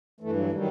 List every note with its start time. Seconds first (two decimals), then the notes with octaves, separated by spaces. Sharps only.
0.21 G2 E3 A3
0.36 F#3
0.52 D#3 F#3 G3